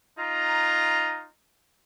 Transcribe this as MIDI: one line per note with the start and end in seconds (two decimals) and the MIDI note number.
0.18 1.26 63
0.18 1.26 65
0.18 1.26 82